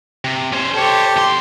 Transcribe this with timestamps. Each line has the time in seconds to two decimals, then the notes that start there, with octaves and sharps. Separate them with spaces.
0.25 C3
0.53 C#4 C5
0.74 G4 A4 C5 C#5
1.17 E2 C6